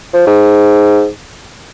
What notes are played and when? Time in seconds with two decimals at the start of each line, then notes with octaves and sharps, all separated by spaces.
0.14 F3
0.27 G#2